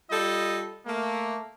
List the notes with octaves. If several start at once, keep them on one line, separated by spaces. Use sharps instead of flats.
G3 F4 A4 D#5
A3 A#3